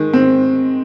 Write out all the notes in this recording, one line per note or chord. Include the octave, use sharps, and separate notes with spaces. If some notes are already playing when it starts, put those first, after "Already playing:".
Already playing: D#3 G#3
C4